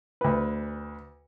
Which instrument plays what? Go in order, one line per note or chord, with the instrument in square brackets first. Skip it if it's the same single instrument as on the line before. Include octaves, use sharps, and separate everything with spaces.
[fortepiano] D2 B4